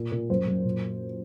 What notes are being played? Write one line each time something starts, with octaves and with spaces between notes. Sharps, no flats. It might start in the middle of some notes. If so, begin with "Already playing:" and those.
Already playing: A#2
A#2
F#2 C5
F#2
A#2